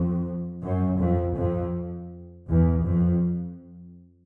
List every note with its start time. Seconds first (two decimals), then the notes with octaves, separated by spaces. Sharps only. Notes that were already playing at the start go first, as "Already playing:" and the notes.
Already playing: F2
0.64 F#2
1.01 F2
1.37 F2
2.50 E2
2.86 F2